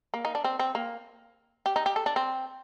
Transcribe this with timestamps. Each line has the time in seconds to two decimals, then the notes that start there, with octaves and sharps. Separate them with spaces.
0.14 A#3
0.25 D#4
0.35 D4
0.44 C4
0.59 C4
0.75 A#3
1.66 G4
1.76 D#4
1.86 G4
1.96 A4
2.06 D4
2.16 C4